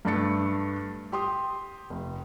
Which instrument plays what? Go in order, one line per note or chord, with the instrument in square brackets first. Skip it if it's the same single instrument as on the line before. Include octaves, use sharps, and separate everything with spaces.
[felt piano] G2 A3 D4 A6 C#7
G4 C6 D#6
F1